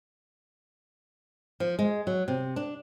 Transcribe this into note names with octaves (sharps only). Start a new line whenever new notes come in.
F3
G#3
F#3
C3
D4